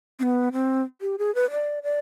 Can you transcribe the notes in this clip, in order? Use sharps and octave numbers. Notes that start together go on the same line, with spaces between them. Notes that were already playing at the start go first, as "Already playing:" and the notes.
C4
B3
C4
G4
G#4
B4
D5
D5